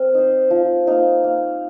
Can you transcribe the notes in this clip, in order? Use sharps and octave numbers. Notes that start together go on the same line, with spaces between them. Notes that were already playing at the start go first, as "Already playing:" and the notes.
Already playing: C4 A#4
D#4 C5
F3
A#3 D#4
A#3